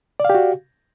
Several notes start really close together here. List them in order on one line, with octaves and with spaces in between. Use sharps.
D5 F5 G4 F#4